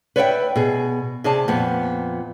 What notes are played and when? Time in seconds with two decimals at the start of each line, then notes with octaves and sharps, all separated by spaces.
0.16 B4 C#5 D5 E5 F5 G5
0.56 B2 G#4
1.24 C3 G#4 D5 A5
1.48 F2 A#2 B3